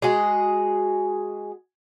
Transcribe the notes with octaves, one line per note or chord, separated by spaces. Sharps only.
G#3 F#4 G#4